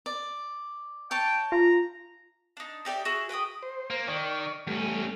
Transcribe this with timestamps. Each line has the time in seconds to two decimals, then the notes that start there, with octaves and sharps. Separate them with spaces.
0.06 D5
1.11 C#5 G5 A5
1.52 F4 A#5
2.57 D4 D#4
2.85 D#4 G4 D5 E5
3.05 F#4 G#4 E5
3.29 B4 G5 B5 D#6
3.63 C5
3.90 A#3
4.08 D#3 D5 C#6
4.67 E2 G3 A3 C#4